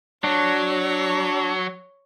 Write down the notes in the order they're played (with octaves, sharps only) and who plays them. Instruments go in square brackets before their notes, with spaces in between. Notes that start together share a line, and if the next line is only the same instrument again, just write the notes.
[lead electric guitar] F#3 [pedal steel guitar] D4 [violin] C#5